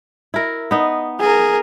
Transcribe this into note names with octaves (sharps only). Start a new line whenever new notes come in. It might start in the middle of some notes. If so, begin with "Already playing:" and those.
E4 A#4
B3 D#4
G#4 A#4